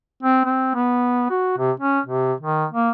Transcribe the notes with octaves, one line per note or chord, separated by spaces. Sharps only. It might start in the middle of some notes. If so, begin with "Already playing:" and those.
C4
C4
B3
F#4
C3
C#4
C3
D#3
A#3